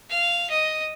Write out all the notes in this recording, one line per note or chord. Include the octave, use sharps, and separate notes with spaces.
F5
D#5